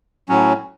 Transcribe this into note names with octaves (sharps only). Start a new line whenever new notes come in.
A2 F#3 C#4